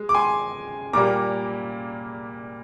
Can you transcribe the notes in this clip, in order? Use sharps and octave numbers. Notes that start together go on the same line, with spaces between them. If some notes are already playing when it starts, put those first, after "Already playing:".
Already playing: G#3
D6
G#5 C6
A#2 G3 A#3 A#5 D6